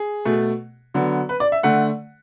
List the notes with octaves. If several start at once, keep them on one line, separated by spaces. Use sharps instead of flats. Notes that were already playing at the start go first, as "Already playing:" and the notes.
Already playing: G#4
B2 A3
D3 F#3 B3
B4
D5
E5
D3 A3 F#5